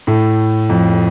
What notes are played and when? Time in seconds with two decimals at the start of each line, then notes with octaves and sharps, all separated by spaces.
0.07 A2
0.70 F2